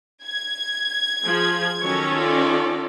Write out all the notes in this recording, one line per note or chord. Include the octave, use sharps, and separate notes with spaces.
G#6
F3 G#4
D#3 F#3 C#4 A4 C#6
F4 D5